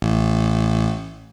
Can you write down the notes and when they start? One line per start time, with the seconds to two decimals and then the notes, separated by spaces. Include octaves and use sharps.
0.02 A1